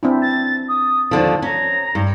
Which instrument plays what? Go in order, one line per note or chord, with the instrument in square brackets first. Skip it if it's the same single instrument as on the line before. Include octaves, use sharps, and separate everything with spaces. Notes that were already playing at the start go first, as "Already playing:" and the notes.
[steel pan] C4 D4 E4
[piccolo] A6
D#6
[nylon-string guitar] D#2 D3 F3 [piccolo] A5
[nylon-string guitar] C#4 [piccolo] A#5
[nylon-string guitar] G2